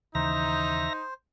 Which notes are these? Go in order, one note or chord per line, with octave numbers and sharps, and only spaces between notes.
D#2 C#3 E3 D#4 C5 E5 A#5 A#6